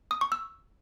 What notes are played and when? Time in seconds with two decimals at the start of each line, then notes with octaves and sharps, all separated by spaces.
0.11 D#6
0.21 C#6
0.32 E6